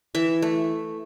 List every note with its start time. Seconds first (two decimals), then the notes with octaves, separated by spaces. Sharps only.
0.15 E3 E5
0.42 A3